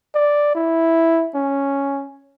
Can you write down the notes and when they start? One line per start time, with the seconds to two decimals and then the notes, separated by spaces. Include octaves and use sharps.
0.15 D5
0.55 E4
1.35 C#4